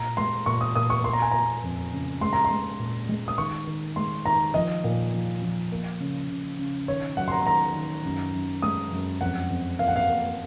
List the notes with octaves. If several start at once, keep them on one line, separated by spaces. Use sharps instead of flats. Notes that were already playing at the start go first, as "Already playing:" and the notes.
Already playing: A#2 A#5
G#3 C6
A#2 C#6
D#6
A#2 D#6
C#6
A#3 C6
A#5
G#5
A#3 A#5
F2
C#3
G#3 C6
A#5
C6
G#3
A#2
G#3
D#6
D#3 C#6
D#3
G#3 C6
D#3 A#5
F3 D#5
A#2
F3
F3
A#3
C#3
C#3
C#3
D#3 C#5
F#3 F#5
C6
A#5
C6
D#3 A#5
D#3
F#2
F#2
G#3 D#6
F#2
F2 F#5
F2
A#3 F5
F#5
F5
A#3